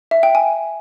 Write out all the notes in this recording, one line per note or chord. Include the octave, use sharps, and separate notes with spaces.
E5
G5
G#5